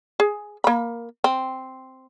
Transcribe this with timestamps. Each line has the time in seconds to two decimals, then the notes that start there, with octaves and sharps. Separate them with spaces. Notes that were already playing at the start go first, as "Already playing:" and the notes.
0.20 G#4
0.64 A#3 B5
1.24 C4